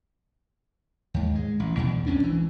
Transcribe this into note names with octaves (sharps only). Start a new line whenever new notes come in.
D#2 G#2
G#3
A1
E2 B2
C2 C3 C#4 D4
G#1 E3